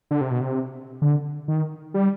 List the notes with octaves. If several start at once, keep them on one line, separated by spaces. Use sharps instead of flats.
D3
C3
B2
C3
D3
D#3
G3